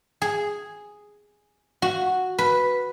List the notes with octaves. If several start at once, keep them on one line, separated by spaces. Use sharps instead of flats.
G#4
F#4
B4